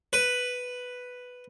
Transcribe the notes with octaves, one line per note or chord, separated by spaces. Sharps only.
B4